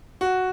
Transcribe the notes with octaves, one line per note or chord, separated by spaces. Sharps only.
F#4